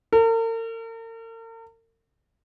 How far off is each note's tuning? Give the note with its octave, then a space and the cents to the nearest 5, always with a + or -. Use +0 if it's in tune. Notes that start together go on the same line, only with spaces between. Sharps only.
A#4 -45